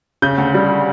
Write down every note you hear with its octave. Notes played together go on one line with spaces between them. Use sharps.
C#3 G6
D2
G3